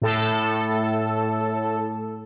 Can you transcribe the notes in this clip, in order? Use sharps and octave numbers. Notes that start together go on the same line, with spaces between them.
A2 A4